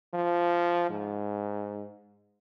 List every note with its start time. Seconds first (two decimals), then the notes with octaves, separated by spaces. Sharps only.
0.14 F3
0.90 G#2